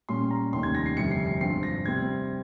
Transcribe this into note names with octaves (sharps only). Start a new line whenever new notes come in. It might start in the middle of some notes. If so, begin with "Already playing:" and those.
A#2 G3 C#4 C6
A#5
F1 D#2 D#3 G3 C#4 C6
G#6
A#6
C7
G1 F2 C3 G3 C#7
C7
C7
G#1 G2 F3 C4 C7
A#6
C3 G3 C4 G#6